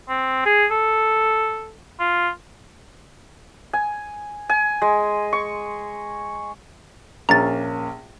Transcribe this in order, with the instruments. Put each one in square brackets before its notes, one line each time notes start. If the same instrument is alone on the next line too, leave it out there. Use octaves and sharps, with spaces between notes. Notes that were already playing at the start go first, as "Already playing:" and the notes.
[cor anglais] C4
G#4
A4
F4
[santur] G#5
G#5
G#3
C#6
[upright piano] A#1 A#3 C#4 [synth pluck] A#5 A6